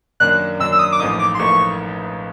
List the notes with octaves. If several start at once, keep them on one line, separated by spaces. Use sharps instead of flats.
F#2 D#3 F#3 A#3 D4 F#6
F#2 D#3 F#3 A#3 D4 E6
E6
D#6
D6
A1 A2 F3 A#3 D#4 D#6
D6
C6
A1 A2 F3 A#3 D#4 C#6